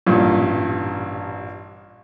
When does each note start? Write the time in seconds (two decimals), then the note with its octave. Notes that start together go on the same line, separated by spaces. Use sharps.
0.06 A1 G2 A#2